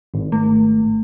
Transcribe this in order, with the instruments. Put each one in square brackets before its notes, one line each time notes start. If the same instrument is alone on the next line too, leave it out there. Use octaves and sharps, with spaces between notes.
[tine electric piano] G#1
[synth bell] A3